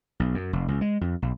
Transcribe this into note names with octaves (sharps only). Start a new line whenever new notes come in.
B1
F#2
F1
C#2
G#3
F2
B1